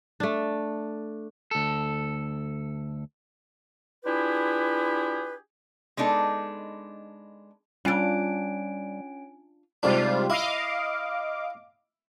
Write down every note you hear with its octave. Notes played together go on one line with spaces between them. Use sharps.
A3 D4
D2 A4
D4 E4 F4 G4 G#4 B4
G#3 B3 D4 D#4 A4
G3 C#4 D4 F4 G#5 D7
G#2 C3 G3 D4 F4
E4 D#5 F5 D6